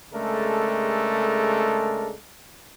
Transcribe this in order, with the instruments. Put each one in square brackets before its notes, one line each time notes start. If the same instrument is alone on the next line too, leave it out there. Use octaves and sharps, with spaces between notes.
[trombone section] C#3 G#3 A3 D4 A4 A#4